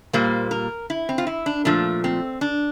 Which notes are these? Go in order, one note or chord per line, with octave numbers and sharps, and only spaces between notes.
A#2 G3 A#3 C5
A#4
E4
C4
F4
E4
D4
A#2 F3 A3 D4
C4
D4